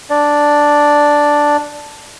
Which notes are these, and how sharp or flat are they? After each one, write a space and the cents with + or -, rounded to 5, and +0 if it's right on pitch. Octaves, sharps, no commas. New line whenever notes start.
D4 +0 D5 +0